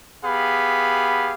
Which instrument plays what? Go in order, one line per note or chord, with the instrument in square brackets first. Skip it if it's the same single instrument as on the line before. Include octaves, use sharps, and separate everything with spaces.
[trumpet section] B3 G4 G#4 F5 B5